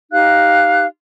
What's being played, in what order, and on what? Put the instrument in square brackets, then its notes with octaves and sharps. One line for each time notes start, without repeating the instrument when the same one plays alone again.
[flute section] D#4 G4 F5 F#6